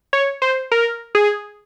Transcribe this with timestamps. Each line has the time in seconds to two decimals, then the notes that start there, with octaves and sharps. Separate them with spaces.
0.13 C#5
0.42 C5
0.71 A#4
1.15 G#4